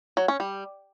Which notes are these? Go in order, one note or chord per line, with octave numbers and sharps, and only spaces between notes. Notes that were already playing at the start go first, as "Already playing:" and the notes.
F#3
C#4
G3